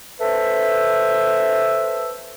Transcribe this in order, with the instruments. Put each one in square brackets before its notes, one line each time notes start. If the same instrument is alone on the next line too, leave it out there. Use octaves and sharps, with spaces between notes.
[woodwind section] A4 B4 C5 E5